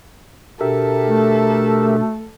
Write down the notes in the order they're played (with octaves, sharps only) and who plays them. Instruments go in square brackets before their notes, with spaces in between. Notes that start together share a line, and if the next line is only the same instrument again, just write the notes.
[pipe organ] B2 D4 [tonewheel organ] G4 A#4 E5 [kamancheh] A4
[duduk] A3